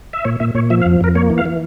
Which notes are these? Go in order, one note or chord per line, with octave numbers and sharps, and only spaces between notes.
E5
A#2 C#5
A#2 E5
A#2 C#5
F3 E5
F5
F2
F2 A#4
A#3 C#5
E3
F5
E3